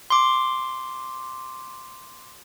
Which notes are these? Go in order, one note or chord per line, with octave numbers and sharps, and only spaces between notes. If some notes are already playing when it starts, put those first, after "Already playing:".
C6 D6